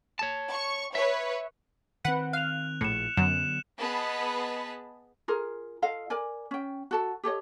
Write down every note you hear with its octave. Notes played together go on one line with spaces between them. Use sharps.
C#5 A5
C#6
B4 C#5 E5
D#3 C4 B4 F#5
F5 F#6 F7
A#1 A2 C#7 E7
F#2 D3 F#3 B3 E7
B3 G#4 B4 D#5 A5 B5
F4 G#4 A#4
F4 A4 D#5 F5
A#4 D5 G#5
C#4 G5
F#4 A4 A5
G4 A4 C#5 D#5